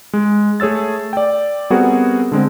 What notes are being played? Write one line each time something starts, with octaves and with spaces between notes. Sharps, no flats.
G#3
A3 G#4 C#5 E6 A6
D5 G5
G3 B3 C4 F#4 G#4 A#4
D3 G#3 C4